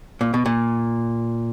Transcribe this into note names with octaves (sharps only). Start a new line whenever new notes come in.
A#2
B2
A#2